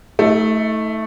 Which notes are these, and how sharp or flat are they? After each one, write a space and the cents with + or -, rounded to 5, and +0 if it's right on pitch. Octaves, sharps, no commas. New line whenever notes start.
A3 +0 D#4 +45